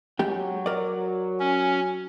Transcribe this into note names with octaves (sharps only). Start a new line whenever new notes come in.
F#3 G#3 G4 G5
A#4 D5
C#4